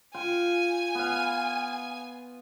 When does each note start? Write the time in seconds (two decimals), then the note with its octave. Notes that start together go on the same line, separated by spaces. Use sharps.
0.14 F4 G5 G#5
0.95 B3 F5